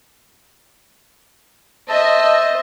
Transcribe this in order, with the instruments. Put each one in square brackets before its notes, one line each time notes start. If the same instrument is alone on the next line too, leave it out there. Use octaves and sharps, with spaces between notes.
[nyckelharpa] C5 E5 [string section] D#5 [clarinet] A5